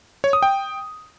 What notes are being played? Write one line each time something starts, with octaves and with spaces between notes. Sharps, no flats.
C#5
D#6
G5